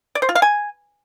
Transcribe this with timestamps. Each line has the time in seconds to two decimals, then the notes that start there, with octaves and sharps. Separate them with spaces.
0.15 D5
0.22 C5
0.29 F4
0.35 F5
0.42 G#5